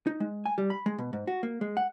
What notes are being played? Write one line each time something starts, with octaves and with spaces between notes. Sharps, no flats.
D#4
G#3
G#5
G3
B5
G#3
B2
G#2
F#4
A#3
G#3
F#5